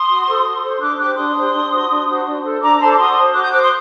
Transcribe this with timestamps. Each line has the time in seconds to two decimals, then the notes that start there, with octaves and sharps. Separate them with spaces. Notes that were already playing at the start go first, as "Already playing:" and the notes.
Already playing: C6 D#6
0.09 F#4
0.26 A4 C5
0.44 F#4
0.62 A4 C5
0.81 D4 D6 F#6
0.98 G4 C5 D6 F#6
1.16 D4 C6 D#6
1.36 G4 C5
1.53 D4
1.71 F#4 C5
1.89 D4
2.07 F#4 C5
2.26 D4
2.43 A4 C5
2.62 D4 A#5 D6
2.76 A#5
2.79 A4 C5 A5 C6
2.89 D6
2.98 F#4 C6 D#6
3.16 C5
3.34 F#4 D6 F#6
3.43 D#6 G6
3.52 C5 D6 F#6
3.61 C6 D#6